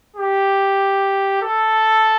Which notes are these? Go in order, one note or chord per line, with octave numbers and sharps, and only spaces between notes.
G4
A4